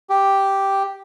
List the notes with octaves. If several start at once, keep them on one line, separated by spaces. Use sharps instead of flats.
G4